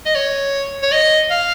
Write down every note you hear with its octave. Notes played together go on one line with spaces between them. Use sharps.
D#5
C#5
C#5
D#5
F5